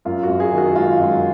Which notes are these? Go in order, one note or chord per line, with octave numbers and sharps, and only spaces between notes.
F#2 F4
F#4
F#2
G#4
D#3
F#4
G#3 F4
F#2